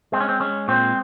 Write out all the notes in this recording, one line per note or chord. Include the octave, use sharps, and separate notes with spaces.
G#3 C4
C#4
C4
G#3 C#4
A#2 C4